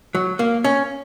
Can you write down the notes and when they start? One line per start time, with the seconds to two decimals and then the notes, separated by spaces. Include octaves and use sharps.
0.15 F#3
0.39 A#3
0.64 C#4